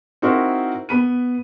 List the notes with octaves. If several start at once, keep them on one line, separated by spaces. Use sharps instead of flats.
C4 D#4 E4 F#4 A#4 C5
B3 B5 D#7